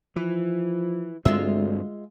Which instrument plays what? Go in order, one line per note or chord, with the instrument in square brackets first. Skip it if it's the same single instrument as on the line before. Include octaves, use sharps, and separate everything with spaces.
[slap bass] E3 [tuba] F3
[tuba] D2 [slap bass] G2 C4 [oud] G#3 F4 E5